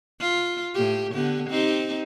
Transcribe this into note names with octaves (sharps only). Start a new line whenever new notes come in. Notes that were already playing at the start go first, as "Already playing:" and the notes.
F4
A2 G4
D3 B3 G4
C4 D#4 G4